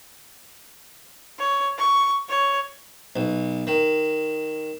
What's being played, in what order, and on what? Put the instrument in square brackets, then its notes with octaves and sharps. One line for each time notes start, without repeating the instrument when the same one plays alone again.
[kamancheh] C#5
C#6
C#5
[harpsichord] B1
D#3